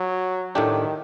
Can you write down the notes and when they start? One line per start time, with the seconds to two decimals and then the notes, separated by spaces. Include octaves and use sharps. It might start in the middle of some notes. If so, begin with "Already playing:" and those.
Already playing: F#3
0.55 A2 D#3 A3 D4 G4